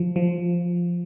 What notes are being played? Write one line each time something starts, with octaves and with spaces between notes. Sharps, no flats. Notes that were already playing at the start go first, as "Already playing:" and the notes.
Already playing: F3
F3